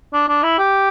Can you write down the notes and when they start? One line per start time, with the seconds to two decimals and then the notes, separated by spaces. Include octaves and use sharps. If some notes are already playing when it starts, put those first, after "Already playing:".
0.13 D4
0.29 D4
0.43 E4
0.59 G4